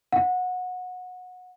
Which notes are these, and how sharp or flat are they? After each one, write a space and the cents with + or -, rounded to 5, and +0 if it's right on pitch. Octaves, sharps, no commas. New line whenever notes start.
F#5 -20